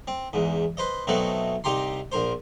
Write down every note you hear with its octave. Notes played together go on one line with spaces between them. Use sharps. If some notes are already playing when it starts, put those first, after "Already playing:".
C4
E2 G#2
B4 C5 D#5
B2 F#3 A3 C4 D#4 F#4
C2 D#4 G4 A#5 C6
A#1 A#4 C5